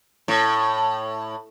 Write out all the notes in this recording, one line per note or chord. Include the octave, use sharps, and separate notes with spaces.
A2